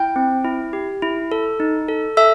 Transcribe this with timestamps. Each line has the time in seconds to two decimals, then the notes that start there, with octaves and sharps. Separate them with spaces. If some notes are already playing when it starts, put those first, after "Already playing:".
Already playing: E4 G5 G6
0.16 C4
0.45 E4
0.73 G4
1.02 E4
1.32 A4
1.60 D#4
1.88 A4
2.17 A4 E5 E6